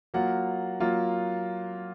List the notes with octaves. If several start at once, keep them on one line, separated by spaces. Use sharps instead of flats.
F#3 A#3 F4 F#5
F#3 A#3 F4